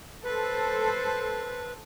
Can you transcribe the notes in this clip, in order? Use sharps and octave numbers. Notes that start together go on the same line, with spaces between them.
A4 B4 C5